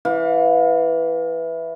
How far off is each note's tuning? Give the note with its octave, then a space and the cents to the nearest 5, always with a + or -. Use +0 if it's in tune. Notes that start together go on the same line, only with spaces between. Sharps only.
E3 +0 F5 +30